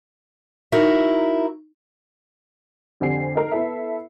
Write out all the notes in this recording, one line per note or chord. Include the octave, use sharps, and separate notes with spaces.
D#4 E4 F#4 A#4 E5
F2 D3 C4 G4 G#5 C7
D#4 A4 A#4 A#5
B3 E4 A4 E5